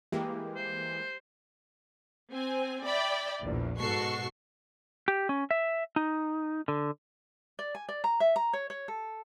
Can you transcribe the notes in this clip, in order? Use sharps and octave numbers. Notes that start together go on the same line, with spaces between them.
E3 G#3 A#3 G4
C5
C4 G#5
D5 E5 G5 B5
A#1 E2
G#2 B2 F#4 A4 C#6 C7
G4
C#4
E5
D#4
D3
D5
G#5
D5
A#5
E5
A#5
C#5
C#5
A4